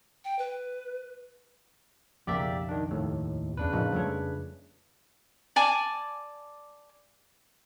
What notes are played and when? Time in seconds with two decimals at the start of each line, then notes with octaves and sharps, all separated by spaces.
0.24 G5
0.39 B4
2.27 B1 F2 C#3 A#3 G4 D5 E5
2.69 D#3 D4
2.91 D#2 A2 A3
3.57 E2 C#3 D4 B4
3.73 A2 C3 F3 A#3 D#4
3.92 F2 F3 G3 A3 C#5
5.56 D5 G#5 A5 D6